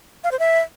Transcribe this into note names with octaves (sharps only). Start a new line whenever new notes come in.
F5
C5
E5